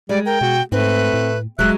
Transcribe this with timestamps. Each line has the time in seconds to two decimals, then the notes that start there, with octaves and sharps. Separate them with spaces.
0.09 G3 G#3 D5
0.26 A#4 G5
0.41 B2 F#4
0.72 G#2 A3 C4 B4
1.14 A2
1.59 E1 F#3 G#3 E5 F#6